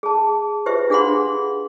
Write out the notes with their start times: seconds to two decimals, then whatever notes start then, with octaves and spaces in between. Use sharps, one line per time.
0.03 G#4 A5
0.66 F4 G4 B4 C5 E5
0.90 D4 G#4 F5 F#5 B5 C6